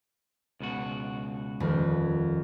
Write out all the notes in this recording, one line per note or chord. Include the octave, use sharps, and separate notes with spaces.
C#2 B2 F#4
D#1 F2